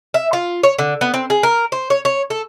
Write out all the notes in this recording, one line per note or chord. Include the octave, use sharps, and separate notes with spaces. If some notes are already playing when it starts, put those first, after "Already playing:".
E5
F4
C#5
D3
B3
C4
G#4
A#4
C5
C#5
C#5
A4